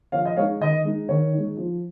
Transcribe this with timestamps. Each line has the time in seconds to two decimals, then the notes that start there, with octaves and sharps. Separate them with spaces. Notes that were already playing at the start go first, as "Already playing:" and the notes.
0.12 F3 C#5 F5
0.25 D#5
0.36 G#3 C#5 F5
0.41 D#4
0.61 D#3 D#5
0.84 G#3 D#4
1.09 D#3 C#5
1.33 G#3 D#4
1.57 F3